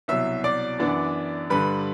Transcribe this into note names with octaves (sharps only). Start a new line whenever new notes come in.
C2 B2 F#3 E5 E6
D5 D6
F#2 E3 B3 D4
G2 D3 G3 B4 B5